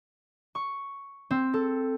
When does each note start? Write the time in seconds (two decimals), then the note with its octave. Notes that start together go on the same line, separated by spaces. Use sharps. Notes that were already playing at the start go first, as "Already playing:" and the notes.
0.55 C#6
1.30 C4
1.53 A4